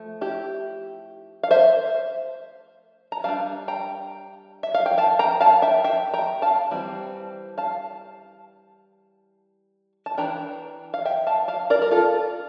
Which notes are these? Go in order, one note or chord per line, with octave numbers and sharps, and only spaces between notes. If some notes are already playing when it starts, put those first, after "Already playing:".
Already playing: F3 A3
E4 G4
F5
C5 E5
A#5
G3 D4 F5 A5
G5 A#5
E5
F5
G5
F5 A5
G5 A#5
F5 A5
E5 G5
E5 G5
G5 A#5
F5 A5
E3 G3 C4
F5 A5
A5
E3 A3 D4 G5 A#5
F5
E5 G5
F5 A5
F5 A5
A#4 D5
A#4
F4 A4